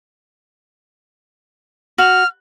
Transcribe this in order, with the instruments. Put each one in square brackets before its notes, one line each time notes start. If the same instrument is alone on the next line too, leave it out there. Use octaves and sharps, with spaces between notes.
[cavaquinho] F#4 [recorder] F6